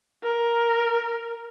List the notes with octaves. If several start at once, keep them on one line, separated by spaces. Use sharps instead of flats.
A#4